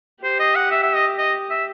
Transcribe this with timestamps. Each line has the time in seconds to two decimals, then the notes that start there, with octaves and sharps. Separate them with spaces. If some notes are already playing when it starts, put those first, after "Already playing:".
0.23 G4 C5
0.40 D#5
0.55 F#5
0.71 E5
0.83 E5
0.95 D#5
1.18 D#5
1.50 E5